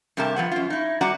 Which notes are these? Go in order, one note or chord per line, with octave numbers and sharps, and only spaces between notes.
G2 C3 G4 A#4 A5
F3 B3 F#5
F#2 F4
D#4 E4
G3 F#4 D5 F#5 A#5